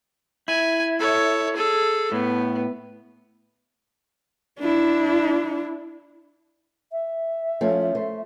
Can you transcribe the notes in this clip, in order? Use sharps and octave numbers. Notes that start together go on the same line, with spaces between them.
E4 G#5
A4 C#5
G#4 A4
A2 B3
D4 E4
E5
F3 A3 C#4
A3 C5